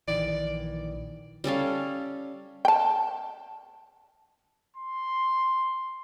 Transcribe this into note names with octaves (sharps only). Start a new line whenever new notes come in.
A#1 D#3 E3 D5
G3 C#4 A4 F5
G5 A5
C6